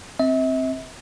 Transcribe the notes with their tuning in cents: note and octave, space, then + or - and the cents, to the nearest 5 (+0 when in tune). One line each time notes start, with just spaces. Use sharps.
C4 +5 E5 -40